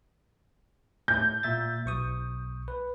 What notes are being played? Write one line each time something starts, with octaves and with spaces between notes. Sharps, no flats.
A2 G6
A#2 E5 A6
B1 C#6 D#6
B4